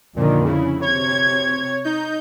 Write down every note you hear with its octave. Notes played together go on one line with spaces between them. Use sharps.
F2 A#2 D3 D#3
C#3 E4
C3 C#5 G#6
D#4 G6